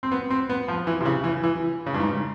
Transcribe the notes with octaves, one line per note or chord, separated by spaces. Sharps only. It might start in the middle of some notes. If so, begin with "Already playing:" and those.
C4
B3
C4
B3
F3
E3
C3
C#3
E3
E3
C#3
G2
G#2